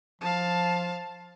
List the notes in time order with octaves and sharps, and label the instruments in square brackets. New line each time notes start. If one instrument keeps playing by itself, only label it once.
[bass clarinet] F3 [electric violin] F5 A5